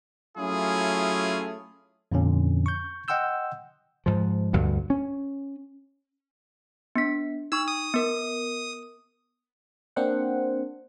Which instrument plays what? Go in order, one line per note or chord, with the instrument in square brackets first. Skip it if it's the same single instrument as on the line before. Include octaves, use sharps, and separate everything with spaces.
[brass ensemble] F#3 A3 C#4 E4 F4 G#4
[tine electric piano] F2 A#2 D3 C#4
C#6 G6
D#5 F#5 G5 C6 E6 G6
[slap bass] G#2 F3
D2 G2 B2
C#4
[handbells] B3 D4 B6
[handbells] D#4 C#6 [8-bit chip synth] E6
[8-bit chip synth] D#6
[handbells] B3 A#4
[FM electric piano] A#3 C4 D4 C5 F#5